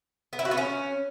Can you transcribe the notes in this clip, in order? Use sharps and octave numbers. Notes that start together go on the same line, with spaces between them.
B3
E4
F#4
B3
C#4